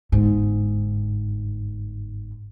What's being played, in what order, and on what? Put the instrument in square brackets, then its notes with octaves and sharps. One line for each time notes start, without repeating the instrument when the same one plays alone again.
[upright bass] G1 G#2